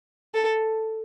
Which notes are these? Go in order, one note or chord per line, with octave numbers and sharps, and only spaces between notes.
A4